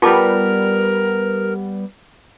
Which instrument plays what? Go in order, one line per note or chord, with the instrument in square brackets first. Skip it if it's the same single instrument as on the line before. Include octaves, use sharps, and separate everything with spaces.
[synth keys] G3 B3 [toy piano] F4 A5 D6 [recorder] A#4